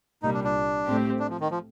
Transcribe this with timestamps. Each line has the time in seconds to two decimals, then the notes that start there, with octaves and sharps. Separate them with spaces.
0.23 C2 A#2 G3 D#4
0.34 D4
0.44 D4
0.87 A2 A3 C4 G4
1.19 D4
1.30 F3
1.41 D#3
1.51 F3